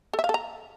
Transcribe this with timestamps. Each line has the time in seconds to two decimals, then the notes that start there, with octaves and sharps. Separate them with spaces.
0.13 A4
0.19 E5
0.24 F5
0.29 A4
0.34 A#5